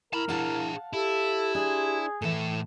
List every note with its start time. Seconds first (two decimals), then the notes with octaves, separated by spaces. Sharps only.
0.13 E4 A#4 A5 B5
0.29 D4 E4 G#4 F5 F#5 A5
0.93 E4 G4 A4
1.55 D4 G#4 C5
2.22 A2 E3 A4 E5